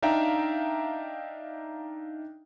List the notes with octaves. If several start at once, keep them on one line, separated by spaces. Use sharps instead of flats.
D4 D#4 E5 F5 G5 A#5